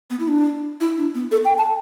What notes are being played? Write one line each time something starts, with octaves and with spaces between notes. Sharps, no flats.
B3
E4
D4
E4
D4
B3
A4
G5
A5